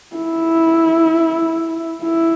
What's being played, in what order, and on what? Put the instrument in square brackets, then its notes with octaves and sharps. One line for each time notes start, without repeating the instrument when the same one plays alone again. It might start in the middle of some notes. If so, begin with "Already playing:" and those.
[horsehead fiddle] E4
E4